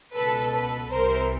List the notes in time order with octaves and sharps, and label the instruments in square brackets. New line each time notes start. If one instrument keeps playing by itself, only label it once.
[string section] C#2 B2 A4 B4
A4 B4
C2 C3 E3 A#4 C5